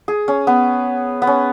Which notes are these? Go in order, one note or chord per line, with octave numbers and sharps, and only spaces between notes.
G#4
C#4
B3
B3
C#4